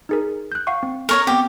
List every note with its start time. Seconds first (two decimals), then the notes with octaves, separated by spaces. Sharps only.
0.09 D#4 G#4 A#4
0.52 F#6 G6
0.67 F5 F#5 C#6
0.83 C4
1.09 A#4 C#5 D#5
1.27 B3 C4 G4